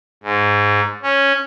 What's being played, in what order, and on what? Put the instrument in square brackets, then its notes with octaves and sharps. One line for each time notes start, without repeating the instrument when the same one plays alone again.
[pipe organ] G#2
C#4